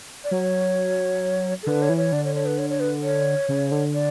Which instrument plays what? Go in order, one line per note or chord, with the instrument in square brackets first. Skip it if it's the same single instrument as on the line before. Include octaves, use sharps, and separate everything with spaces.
[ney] D5
[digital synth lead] F#3 [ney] C#5
[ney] A4
[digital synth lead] D3 [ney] B4
[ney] C#5
[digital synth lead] E3
[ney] C#5
[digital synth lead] D3 [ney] D5
[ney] C#5
C#5
B4
C#5
C#5
B4
C#5
[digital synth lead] C#3
D3
[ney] D5